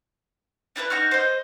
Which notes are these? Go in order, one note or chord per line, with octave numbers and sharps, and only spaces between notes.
D4 E4 A#4 B4
D#4 F#4 C#6 F6
C5 D#5